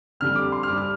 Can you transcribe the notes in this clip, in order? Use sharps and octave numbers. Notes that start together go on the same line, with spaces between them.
F2 D3 G3 F6
D6
C6
F6
G2 G3 D6
F6